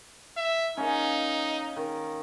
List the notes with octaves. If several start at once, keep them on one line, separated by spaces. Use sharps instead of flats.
E5
A#3 C#4 D#4
D#3